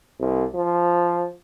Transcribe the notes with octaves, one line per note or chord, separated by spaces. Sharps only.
C2
F3